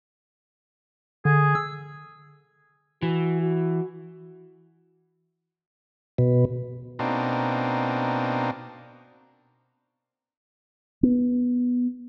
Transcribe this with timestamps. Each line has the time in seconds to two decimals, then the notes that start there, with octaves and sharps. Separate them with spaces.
1.25 D3 G#4
1.55 E6
3.02 E3 F#4
3.42 F#4
6.18 B2
6.99 B2 A#3 C4 D4 D#4
11.03 B3